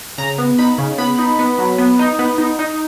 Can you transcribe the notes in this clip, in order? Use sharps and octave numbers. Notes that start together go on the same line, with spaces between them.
C#3 A#5
B3
D#4 B5
C#3
B3 B5
D#4
B3
F#3
B3
D#4
B3
D#4
D#4